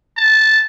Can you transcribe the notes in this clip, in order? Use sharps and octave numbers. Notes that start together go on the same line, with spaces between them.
A5